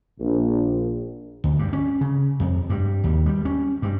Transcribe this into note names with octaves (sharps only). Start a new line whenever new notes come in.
A#1
D2
G2
C#4
C#3
F2
G2
D#2
G3
C#4
G2